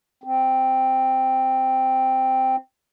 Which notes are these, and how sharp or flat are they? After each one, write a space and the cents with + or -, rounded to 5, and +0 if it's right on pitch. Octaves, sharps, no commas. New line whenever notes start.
C4 +0